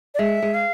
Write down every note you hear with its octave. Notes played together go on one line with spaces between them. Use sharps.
D5
G#3 E5
G#3
F5